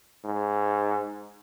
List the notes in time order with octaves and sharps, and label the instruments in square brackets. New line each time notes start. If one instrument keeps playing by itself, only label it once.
[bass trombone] G#2